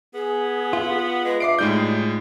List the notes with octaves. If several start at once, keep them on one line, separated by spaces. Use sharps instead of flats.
B3 G#4
F4
G#3 B4
D4 E5 D6 C7 D7
A2 G3 G#3 D#4 G6